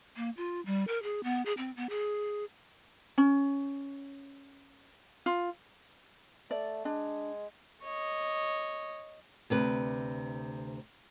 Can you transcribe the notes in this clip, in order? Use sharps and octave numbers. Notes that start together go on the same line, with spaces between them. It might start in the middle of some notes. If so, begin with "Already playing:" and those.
A#3
F4
G3
A#4
G#4
B3
G#4
C4
B3
G#4
C#4
F4
A3 D5
G#3 D4
C#5 D#5
D2 C3 B4